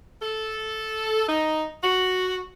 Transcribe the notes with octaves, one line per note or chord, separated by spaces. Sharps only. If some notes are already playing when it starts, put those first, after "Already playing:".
A4
D#4
F#4